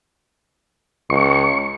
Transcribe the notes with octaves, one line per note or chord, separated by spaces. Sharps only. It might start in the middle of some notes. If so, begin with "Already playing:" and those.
C#2 C#6